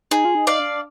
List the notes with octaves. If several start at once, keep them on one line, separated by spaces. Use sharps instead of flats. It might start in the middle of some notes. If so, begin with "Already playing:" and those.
D#4 G#4
F4
D#4
D5 F5
D4